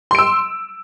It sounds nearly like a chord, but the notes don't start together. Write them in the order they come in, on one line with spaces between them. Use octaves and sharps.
C6 D7 E6